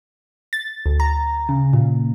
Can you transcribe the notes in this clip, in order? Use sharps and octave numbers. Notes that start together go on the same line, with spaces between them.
A6
D2
A#5
C#3
A#2